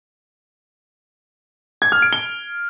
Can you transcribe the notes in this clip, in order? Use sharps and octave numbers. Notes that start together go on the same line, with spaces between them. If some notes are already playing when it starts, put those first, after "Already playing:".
G#6
F6
D7
G7